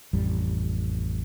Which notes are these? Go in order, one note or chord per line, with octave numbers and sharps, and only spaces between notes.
A1 F2 G3